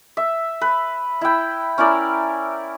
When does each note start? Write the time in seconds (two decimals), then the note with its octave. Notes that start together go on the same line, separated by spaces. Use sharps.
0.17 E5
0.61 B4
1.21 E4 G5
1.78 C#4 E4 A#4 D5